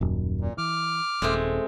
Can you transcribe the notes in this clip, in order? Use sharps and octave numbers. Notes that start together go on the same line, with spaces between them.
D#1 F#2
A#2
E3 D6 F6
D#1 G#3 A3 C4